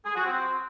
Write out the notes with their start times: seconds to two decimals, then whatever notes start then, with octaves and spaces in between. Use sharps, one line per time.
0.05 G#4
0.15 F#4
0.26 C4